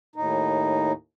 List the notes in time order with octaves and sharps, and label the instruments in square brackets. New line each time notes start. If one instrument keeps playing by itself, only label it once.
[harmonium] D#2 A2 D#4